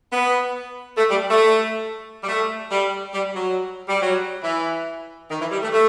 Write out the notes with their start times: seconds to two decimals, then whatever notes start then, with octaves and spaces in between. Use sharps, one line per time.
0.11 B3
0.98 A3
1.09 G3
1.30 A3
2.22 G3
2.28 A3
2.70 G3
3.13 G3
3.35 F#3
3.88 G3
4.00 F#3
4.43 E3
5.30 D#3
5.40 E3
5.51 G3
5.62 A3
5.73 A3